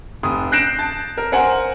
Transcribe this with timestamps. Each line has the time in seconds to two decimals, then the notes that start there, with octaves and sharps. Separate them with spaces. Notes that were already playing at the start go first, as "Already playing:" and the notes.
0.23 F1 D#6
0.52 F#6 G6 A#6 C7 D7 E7
0.79 A5
1.18 A#4
1.32 A#4 C5 F#5 G#5